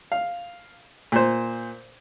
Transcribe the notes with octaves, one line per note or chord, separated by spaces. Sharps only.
F5
A#2 C5